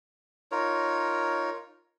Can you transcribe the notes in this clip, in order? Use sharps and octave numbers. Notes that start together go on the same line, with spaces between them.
D#4 F4 A#4 C#5